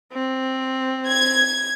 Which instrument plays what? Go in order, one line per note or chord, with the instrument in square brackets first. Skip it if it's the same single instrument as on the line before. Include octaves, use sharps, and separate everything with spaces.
[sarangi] C4
[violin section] G#6